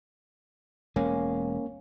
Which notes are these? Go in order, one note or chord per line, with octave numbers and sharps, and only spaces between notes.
E1 G#3 A#3 C#4